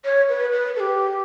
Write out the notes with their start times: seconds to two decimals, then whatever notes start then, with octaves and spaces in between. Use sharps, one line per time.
0.05 C#5
0.29 B4
0.53 B4
0.76 A4
0.80 G4